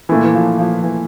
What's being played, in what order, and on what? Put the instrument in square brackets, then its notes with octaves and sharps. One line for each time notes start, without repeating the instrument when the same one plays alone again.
[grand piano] A#2 A3 E4 [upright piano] E3
[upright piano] E3
F3
F3
E3